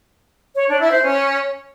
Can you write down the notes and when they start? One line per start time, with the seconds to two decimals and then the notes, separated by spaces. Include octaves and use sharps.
0.56 C#5
0.68 D4
0.80 E4
0.92 C5
1.03 C#4